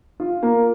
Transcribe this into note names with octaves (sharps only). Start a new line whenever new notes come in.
F4
A#3